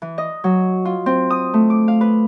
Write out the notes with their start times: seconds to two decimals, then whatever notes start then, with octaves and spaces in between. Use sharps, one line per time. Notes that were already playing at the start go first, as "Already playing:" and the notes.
0.02 E3
0.18 D#5
0.44 F#3
0.85 F4
1.06 C4
1.30 D#6
1.54 A3
1.70 D6
1.88 F5
2.01 B4